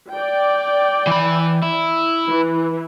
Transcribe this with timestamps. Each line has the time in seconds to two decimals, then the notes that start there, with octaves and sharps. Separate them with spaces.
0.11 D5 G5
1.07 E3 B5
1.62 E4
2.28 E3